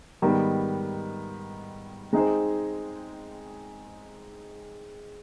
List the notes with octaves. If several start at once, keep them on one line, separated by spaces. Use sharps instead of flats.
G#2 D#3 G3 B3
G#3 C4 D#4 G#4 C5